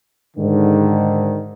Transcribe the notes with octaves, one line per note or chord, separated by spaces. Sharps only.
G#2 D3 D#3